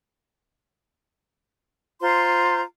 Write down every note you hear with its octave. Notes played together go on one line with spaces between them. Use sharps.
F4 C5 A#5 C6